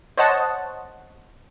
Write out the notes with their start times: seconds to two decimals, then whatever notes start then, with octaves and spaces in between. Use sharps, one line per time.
0.17 C5 C#5 D#5 F#5 A5